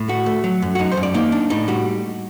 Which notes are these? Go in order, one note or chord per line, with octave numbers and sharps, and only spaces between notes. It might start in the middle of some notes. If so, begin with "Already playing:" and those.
Already playing: A2
A3 F#4
A3
F#3
F#2
F#4
F#2 D#4
C5
F#2
D5
A#3 D#4
D4
A2 D#4
G3 F#4